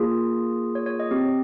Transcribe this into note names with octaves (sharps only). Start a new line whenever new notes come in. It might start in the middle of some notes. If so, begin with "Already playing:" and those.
Already playing: A#3 F4 G#4
C#5
C#5
D#5
C4 G4